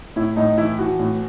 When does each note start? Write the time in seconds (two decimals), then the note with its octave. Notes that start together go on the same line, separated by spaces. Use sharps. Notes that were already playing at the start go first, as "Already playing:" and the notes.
0.16 A2 E4
0.36 A2 D#4
0.58 E3 E4
0.79 E3 F#4
0.99 A2